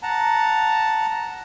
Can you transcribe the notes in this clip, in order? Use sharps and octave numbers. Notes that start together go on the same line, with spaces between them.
F#5 A5 A#5